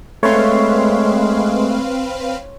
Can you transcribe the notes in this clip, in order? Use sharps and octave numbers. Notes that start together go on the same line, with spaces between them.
G#3 A3 C4 B4 C#5 F5 C6